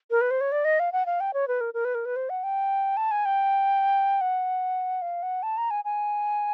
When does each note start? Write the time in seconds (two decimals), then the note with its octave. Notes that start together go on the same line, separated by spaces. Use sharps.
0.11 A#4
0.21 B4
0.31 C5
0.41 C#5
0.52 D5
0.65 D#5
0.80 F5
0.93 F#5
1.06 F5
1.20 G5
1.34 C#5
1.48 B4
1.61 A#4
1.74 A#4
1.85 B4
1.95 A#4
2.05 B4
2.16 C5
2.30 F#5
2.43 G5
2.97 A5
3.11 G#5
3.25 G5
4.21 F#5
5.02 F5
5.23 F#5
5.43 A5
5.58 A#5
5.71 G#5
5.85 G#5